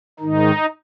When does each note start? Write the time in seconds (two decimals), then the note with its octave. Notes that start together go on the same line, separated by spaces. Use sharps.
0.20 G#2 D#3 D#4